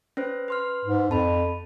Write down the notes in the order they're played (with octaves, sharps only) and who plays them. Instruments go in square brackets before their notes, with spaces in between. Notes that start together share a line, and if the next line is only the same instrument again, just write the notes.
[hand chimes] C#4 B4 C5
B4 C6 F6
[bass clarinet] G#2
[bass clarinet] F2 [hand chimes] A5 B5